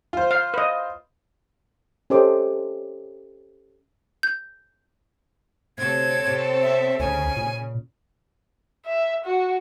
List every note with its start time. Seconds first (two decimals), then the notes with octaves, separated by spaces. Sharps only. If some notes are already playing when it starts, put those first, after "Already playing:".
0.13 F4 C5
0.31 F5
0.54 B4 D#5
2.10 C#4 G4 A4 C5 D#5 D6
4.23 G6
5.78 D2 C3 C4 A4 C#5 G#6
6.27 C3
6.62 E5
7.00 D2 C#3 C#4 D#4 G#5
7.37 A#2
8.86 E5
9.25 F#4